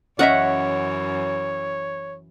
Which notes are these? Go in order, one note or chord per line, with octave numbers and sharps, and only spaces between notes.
F#2 E3 C#4 C#5 D#5 E5 F#5 A#5